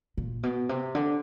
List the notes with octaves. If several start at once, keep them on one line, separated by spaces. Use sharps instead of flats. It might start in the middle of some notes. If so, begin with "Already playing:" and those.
A#2
B2
C3
D3